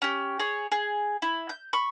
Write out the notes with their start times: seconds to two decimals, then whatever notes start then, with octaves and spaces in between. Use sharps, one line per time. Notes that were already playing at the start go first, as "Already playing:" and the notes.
0.02 C#4 G4
0.39 G#4 C#5
0.72 G#4
1.22 E4
1.49 G6
1.73 B5 C#6